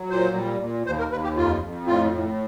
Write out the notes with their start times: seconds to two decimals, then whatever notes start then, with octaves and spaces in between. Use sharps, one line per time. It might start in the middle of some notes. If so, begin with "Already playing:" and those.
Already playing: F#3
0.10 A#2 C5
0.36 G3
0.60 A#2
0.86 D#2 C5
0.99 A#4
1.11 D#2 B4
1.24 G4
1.36 F2 F4
1.62 F2
1.87 A2 F4
2.12 A2